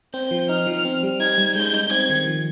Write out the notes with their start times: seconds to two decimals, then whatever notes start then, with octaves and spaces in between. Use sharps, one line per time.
0.14 C4 G6
0.31 F3
0.49 D#4 F6
0.67 F3
0.85 C4
1.03 G3
1.20 D#4 G#6
1.38 G3
1.55 G#3 G6
1.73 D#4
1.91 C4 G#6
2.10 D#3
2.27 F3